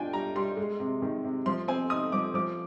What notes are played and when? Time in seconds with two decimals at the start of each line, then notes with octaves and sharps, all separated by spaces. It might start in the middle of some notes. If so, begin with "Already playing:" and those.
Already playing: D4 F4 G5 G#5
0.13 G3 A#5
0.36 G3 C6
0.57 G#3
0.80 C3
1.02 D#3
1.24 C3
1.46 F3 C6
1.68 C4 G#5
1.90 D#4 D#6
2.12 F3 D6
2.34 F3 D6